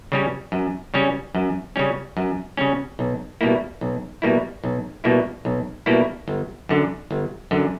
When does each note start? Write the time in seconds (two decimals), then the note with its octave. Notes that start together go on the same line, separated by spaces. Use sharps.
0.12 C#3 G3 C#4
0.52 F#2
0.94 C#3 G3 C#4
1.35 F#2
1.76 C#3 G3 C#4
2.17 F#2
2.57 C#3 G3 C#4
2.99 B1
3.41 B2 G3 A#3 E4
3.81 B1
4.22 B2 G3 A#3 E4
4.64 B1
5.04 B2 G3 A#3 E4
5.45 B1
5.86 B2 G3 A#3 E4
6.28 G1
6.69 F#2 D3
7.11 G1
7.51 F#2 D3